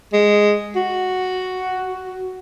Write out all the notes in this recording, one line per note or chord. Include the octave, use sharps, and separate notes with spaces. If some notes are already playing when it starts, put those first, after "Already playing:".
G#3
F#4